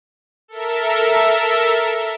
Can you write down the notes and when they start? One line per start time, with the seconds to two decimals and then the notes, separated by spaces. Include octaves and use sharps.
0.48 A4 A#4 E5